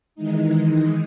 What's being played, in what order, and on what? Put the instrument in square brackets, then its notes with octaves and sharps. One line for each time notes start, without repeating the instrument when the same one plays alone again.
[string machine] D#3 E3 G#3 D#4